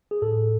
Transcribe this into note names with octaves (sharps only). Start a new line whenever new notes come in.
G#4
A2 A4